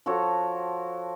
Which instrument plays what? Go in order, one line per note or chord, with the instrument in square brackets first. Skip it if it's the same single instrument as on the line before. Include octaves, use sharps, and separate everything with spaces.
[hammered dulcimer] F3 F#4 A4 C#5